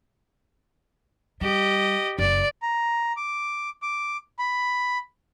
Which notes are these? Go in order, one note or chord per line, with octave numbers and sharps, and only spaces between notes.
G3 G4 D#5
F#1 D5
A#5
D6
D6
B5